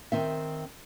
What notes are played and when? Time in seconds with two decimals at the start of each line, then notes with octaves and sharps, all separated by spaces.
0.12 D#3 C4 E5